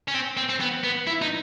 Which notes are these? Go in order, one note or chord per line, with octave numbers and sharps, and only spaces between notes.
C#4
C4
C4
C4
B3
B3
E4
D#4